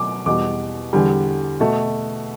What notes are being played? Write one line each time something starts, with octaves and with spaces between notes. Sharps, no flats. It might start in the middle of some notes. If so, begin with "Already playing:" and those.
Already playing: B2 F#3 A3 D6
E2 B2 G3 D6
E2 D3 G3
B2 A3